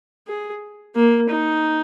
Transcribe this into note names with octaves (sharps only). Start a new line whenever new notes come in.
G#4
A#3
D#4